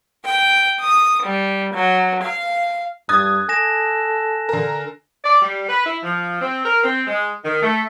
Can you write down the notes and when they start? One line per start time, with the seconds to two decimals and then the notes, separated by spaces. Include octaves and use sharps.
0.25 G5
0.80 D#6
1.23 G3
1.74 F#3
2.23 F5
3.09 G2 D#6 F#6 G#6 A6
3.49 A4 G#5 A#6 E7
4.49 D3 A#4
5.24 D5
5.42 G3
5.68 B4
5.85 E4
6.03 F3
6.40 C4
6.64 A#4
6.83 C4
7.07 G#3
7.44 D#3
7.63 A3